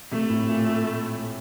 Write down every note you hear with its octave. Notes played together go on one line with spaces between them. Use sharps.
C3 A3
A2
A#2
A#2